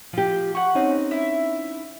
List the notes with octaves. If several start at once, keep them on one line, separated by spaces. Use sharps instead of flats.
F3 G4
F#5 C#6
C4 C#4 D#4
E4